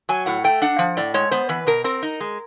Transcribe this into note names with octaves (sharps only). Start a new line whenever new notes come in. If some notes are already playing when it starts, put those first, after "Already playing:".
F#3 G#5
A2 F#5
A3 G5
D4 F#5
F3
A2 D5
G#3 C#5
B3 C5
E3 B4
B2 A#4
C4 A#4
D#4
G#3